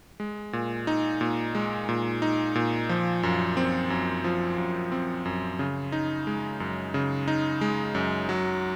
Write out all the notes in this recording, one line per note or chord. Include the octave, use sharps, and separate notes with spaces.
G#3
A#2
D#4
A#2
G#3
A#2
D#4
A#2
F3
F#2
C4
F#2
F3
F#2
C4
F#2
C#3
D#4
G#3
F#2
C#3
D#4
G#3
F#2
F#3